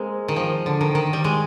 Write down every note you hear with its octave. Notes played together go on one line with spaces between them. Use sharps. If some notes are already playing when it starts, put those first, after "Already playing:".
Already playing: G#3 A#3 C4
D#3
F3
D3
D#3
D#3
G3
G#3